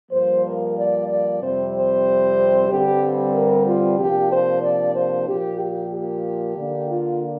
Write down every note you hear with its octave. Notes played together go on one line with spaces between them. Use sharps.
G2 F3 A#3 C5
A#4
D5
D5
F2 C3 G3 C4 C5
C5
G2 D3 G3 C4 G4
A#4
F4
C3 F3 A#3 D4 G4
C5
D5
C5
A#2 F3 A#3 G4
G4
G4
D3 A#3 D4
F4